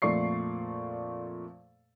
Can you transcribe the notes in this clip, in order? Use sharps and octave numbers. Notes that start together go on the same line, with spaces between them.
F2 A#2 A3 D5 C#6 C7